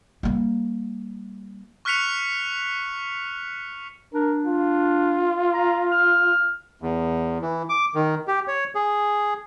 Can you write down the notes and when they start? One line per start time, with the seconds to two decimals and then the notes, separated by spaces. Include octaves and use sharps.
0.23 G3 A#3
1.85 C#6 F6 F#6 B6 C#7 F7
4.14 D4 A#4
4.46 F4
5.53 A#5
5.91 F6
6.82 E2
7.42 E3
7.69 D6
7.95 D#3
8.27 G4
8.48 C#5
8.75 G#4